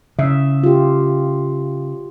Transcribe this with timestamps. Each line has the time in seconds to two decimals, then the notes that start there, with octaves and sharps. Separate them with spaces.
0.19 C#3 E5
0.64 F4 G4